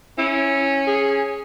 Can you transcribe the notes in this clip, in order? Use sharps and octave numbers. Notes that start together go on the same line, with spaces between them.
C#4 E4
G#4